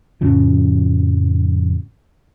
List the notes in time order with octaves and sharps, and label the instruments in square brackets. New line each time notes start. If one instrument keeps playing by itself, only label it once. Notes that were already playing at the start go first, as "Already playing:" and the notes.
[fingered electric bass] F2 A2 C#3 F3